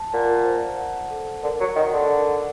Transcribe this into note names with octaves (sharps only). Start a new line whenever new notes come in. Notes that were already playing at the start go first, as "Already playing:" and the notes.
Already playing: A5
A#2 F#5
C5
F#5
A4
D3 A#4
F#3
D#3 F#5
D3
A#4